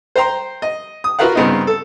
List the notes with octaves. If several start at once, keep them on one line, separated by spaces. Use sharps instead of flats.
C5 G5 A#5 C6
D#5
D#6
F4 F#4 A#4 B4 F5 F#5
G2 C#3 B3 C4 D#4 D#5
A4